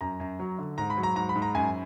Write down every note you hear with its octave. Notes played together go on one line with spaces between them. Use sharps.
F#2 A#5
F#2
F#3
D3
G#2 A#5
B5
F#3
A#5
G#2 A#5
B5
G#2
A#5
F#2 G#5